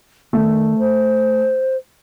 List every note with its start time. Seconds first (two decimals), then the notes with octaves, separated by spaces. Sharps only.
0.33 D#3 A3
0.79 C5